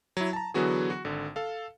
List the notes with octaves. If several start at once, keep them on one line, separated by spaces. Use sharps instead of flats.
F#3 E4
A5 A#5
D3 E3 F#3 B3 F#4 G#4
F#4
G#1 D3
A4 F5